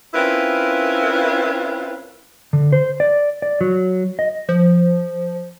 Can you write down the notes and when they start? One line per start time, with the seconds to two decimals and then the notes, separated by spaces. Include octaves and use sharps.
0.14 C4 C#4 E4 F4 A#4 B4
2.53 D3
2.73 C5
3.00 D5
3.42 D5
3.61 F#3
4.19 D#5
4.49 F3